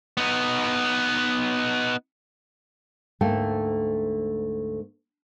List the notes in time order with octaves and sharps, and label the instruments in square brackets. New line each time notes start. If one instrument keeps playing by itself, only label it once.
[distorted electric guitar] B3 D#4
[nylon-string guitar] D2 G#2 A3 A#3 A4 G5